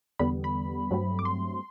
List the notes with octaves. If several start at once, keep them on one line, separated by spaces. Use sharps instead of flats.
E2 D3 G3 B3 B5
B5
G2 F#3 A3 C4
D6
C6